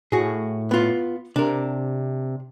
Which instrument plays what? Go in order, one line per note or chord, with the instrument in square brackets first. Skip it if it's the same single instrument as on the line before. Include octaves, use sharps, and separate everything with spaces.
[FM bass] A2 [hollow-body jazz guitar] F#4 G#4
[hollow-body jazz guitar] B3 F4
[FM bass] C3 [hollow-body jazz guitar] D4 A#4